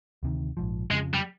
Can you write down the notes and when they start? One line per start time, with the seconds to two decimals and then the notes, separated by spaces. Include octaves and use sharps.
0.23 D2 C3 D#3
0.57 A#1 G#2 F3
0.91 F2 C#3 F3 G#3
1.14 G3